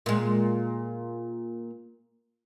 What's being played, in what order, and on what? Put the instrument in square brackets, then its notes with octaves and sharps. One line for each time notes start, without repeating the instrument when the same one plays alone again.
[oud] A#2 G#3